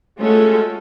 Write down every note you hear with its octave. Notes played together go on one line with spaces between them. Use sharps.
G#3 A3 C#4 F4 F#4 A4